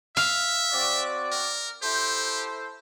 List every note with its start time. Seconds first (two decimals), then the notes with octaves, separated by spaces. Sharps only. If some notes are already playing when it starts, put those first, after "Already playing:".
0.17 E5 F5
0.73 C4 F#4 D5
1.32 A#4
1.82 E4 G4 A4 C5